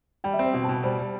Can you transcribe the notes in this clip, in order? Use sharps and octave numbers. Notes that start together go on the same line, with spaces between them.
G3 G5
E5
C4
C5
B2 G5
A5
B2
A5
G3 C5
G3